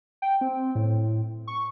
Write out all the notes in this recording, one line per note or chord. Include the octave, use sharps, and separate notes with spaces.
G5
C4
A2
C#6